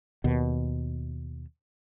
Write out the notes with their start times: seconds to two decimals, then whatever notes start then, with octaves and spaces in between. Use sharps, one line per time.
0.24 D#2 B2